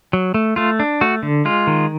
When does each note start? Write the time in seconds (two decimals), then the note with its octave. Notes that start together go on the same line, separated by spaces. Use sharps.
0.13 F#3
0.34 A3
0.56 A3 F4
0.80 D4
1.01 A3 F#4
1.23 D3
1.45 G#3 F4
1.67 D#3